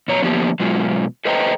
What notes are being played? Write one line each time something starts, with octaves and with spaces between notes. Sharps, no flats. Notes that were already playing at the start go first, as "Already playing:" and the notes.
A#2 C#5 A#5
D3 F3 A#3 B3 D4 G4
B2 F#3 G#3 F4
A4 B4 C5 D#5 G5 A#5